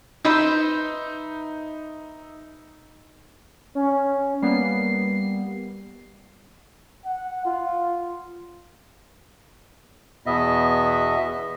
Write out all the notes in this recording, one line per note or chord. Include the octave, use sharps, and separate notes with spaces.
D#4 B4 C5 E5
C#4
G3 A#3 B3 C7
F#5
F4
E2 B2 B3 D#5 E5